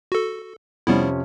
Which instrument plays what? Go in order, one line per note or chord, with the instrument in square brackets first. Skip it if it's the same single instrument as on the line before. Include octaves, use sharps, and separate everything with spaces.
[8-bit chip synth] F#4 A4
[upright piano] F2 C3 C#4 [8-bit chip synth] G3 B3 E4